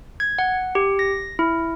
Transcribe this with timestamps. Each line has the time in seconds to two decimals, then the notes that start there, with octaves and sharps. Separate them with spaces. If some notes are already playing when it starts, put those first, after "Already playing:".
0.20 G#6
0.39 F#5
0.75 G4
0.99 A#6
1.39 E4